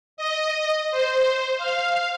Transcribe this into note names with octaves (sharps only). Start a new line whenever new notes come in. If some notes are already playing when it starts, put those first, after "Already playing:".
D#5
C5
F5